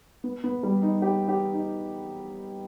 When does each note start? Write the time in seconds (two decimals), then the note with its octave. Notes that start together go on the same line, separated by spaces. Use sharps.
0.24 B3
0.44 B3
0.63 G3
0.82 D#4
1.02 G4
1.28 G4
1.53 D#4